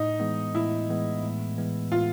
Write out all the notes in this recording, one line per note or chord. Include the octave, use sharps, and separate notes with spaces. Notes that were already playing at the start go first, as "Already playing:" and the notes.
Already playing: A2 D#4
E3 G#3 B3
A2 E4
E3 G#3 B3
A2
E3 G#3 B3
A2 F4